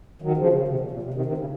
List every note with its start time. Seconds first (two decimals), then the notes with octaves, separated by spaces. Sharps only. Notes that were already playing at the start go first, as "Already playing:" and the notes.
0.22 D#3 F#3
0.37 C#3 F3
0.53 C#3
0.68 C3
0.79 A#2
0.91 A#2
1.03 C3
1.14 C3 D#3
1.25 C3 D#3
1.37 C#3